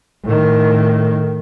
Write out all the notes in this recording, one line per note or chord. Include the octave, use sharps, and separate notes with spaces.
A2 D#3